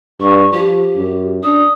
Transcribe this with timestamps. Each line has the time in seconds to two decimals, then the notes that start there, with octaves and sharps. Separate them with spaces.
0.20 G2 C#6
0.52 F3 G4
0.96 F#2
1.43 D4 D#6